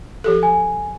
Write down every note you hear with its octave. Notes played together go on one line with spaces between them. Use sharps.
F3 G4 A4
G#5